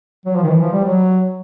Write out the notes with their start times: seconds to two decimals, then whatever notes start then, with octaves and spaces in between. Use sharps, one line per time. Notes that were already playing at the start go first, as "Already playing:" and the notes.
0.26 F#3
0.36 F3
0.43 D#3
0.49 E3
0.61 F3
0.72 G3
0.85 F#3